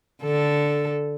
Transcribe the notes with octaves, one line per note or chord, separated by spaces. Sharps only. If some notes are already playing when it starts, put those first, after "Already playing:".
D3 A4